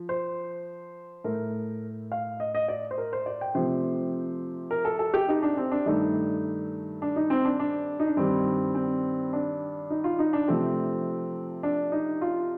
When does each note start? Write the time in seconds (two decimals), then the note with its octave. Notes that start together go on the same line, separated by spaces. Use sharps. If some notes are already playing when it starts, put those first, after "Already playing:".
Already playing: F3
0.09 C5
1.24 A2 A3 A#4
2.12 F5
2.40 D#5
2.55 D#5
2.68 D5
2.91 C5
2.98 A#4
3.13 C5
3.26 D5
3.41 G5
3.55 C3 F3 A3 C5
4.71 A#4
4.85 A4
4.99 A4
5.14 G4
5.28 D#4
5.43 D4
5.57 C4
5.71 D4
5.86 G2 D#3 A3 D#4
7.02 D4
7.16 D#4
7.30 C4
7.45 D4
7.60 D4
8.00 D#4
8.08 D4
8.17 G2 D#3 G3 C4
8.75 C4
9.33 D4
9.90 D#4
10.04 F4
10.19 D#4
10.33 D4
10.48 C3 F3 A3 C4
11.63 D4
11.92 D#4
12.22 F4